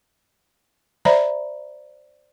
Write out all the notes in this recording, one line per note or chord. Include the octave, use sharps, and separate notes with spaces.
C5 D5 E5 A#5 B5